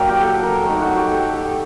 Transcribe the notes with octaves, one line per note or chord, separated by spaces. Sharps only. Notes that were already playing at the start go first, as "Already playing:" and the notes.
Already playing: F#3 A#3 D4 A#4 G5
G4
A4
A#4
A3 D#4 A4
F#4
G4
A4
G4